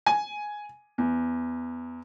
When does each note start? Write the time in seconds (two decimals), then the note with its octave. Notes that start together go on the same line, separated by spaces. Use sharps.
0.06 G#5
0.98 E2